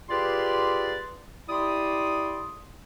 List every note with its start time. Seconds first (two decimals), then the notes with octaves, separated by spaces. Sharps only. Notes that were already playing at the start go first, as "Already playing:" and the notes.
0.09 F4 G4 G#4 B4 D5 C6
1.49 E4 G4 D5 C6 D#6